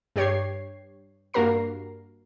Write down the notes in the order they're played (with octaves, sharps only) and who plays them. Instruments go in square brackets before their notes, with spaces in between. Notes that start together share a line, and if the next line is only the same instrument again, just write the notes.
[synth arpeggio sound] G2 G4 C#5 G#6 C7
G2 A#3 F#4 A#4 A#5 C7